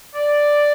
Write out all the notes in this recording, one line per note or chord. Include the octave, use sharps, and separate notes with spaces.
D5